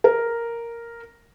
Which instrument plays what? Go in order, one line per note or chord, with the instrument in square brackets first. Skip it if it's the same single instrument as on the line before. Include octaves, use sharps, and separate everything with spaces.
[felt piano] A#4